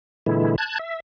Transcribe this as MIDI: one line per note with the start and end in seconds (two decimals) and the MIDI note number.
0.26 0.56 46
0.26 0.56 50
0.26 0.56 52
0.26 0.56 56
0.26 0.56 64
0.58 0.78 81
0.58 0.78 90
0.58 0.78 92
0.79 1.00 76